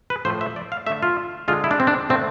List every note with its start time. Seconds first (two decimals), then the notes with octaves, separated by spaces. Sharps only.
0.10 B4
0.25 A2 F3 A3 C5
0.41 E5
0.56 D5
0.72 F5
0.87 D3 A3 E5
1.03 F4
1.48 D3 G#3 F4
1.64 E4
1.71 D4
1.80 C4
1.87 D4
2.09 D3 A3 C4